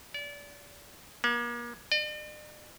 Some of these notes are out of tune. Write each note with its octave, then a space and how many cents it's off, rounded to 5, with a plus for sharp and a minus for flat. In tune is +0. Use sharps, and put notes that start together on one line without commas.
D5 -30
A#3 +40
D5 +45